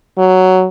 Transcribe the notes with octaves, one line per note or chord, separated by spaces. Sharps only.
F#3